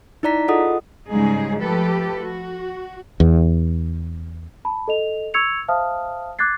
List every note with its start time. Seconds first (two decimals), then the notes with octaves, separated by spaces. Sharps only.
0.23 D#4 E4 D5 A#5 B6
0.48 F4 G#4 A4 D#5 F#5 D#6
1.07 G#2 C#3 G3 G#3 D#4 G#4
1.59 F3 A3 G4 A4 B4
2.23 F#4
3.20 E2
4.65 A5 B5
4.88 A4 D#5 F7
5.34 C#6 E6 G#6 C#7 F7
5.68 C5 E5 F5 A5 D#6 F6
6.39 D6 F#6 G#6 A6 C7